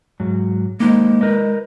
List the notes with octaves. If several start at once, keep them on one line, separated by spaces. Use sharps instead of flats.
G#2 F#3
G#3 A#3 D#4 C5
A#4 B4 D#5